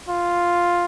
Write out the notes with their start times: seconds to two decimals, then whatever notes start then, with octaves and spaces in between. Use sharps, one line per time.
0.09 F4